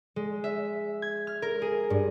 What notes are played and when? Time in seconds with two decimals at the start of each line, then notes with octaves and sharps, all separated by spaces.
0.16 G#3
0.44 E5
1.02 G#6
1.27 F6
1.42 A#4
1.62 G#4
1.90 G2